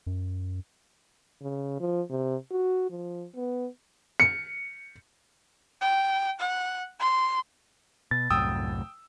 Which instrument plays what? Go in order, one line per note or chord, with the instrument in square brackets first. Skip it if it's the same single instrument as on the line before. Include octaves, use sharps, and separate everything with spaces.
[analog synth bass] F#2
[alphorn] C#3
F3
C3
F#4
F3
B3
[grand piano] C#7
[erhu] G5
F#5
C6
[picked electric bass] B2 [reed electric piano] A6
[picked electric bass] C2 F#2 A2 [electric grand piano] G5 D#6 E6